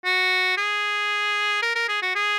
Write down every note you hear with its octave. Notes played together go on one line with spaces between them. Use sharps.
F#4
G#4
A#4
A#4
G#4
F#4
G#4